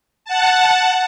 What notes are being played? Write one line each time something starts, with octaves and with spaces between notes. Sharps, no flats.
F#5 A5